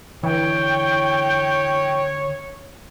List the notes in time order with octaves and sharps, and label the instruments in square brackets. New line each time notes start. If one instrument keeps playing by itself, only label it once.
[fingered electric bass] D3 [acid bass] E3 [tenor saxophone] C#5 [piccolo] G5